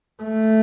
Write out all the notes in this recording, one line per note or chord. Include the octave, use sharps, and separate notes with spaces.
A3